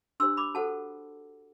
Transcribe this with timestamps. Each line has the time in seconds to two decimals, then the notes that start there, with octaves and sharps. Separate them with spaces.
0.20 D4 G4 C5 C6 E6
0.37 B5 D6
0.55 F#4 A4 C5 F#5 A5